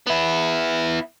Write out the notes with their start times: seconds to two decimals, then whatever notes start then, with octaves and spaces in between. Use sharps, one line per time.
0.07 B3 E4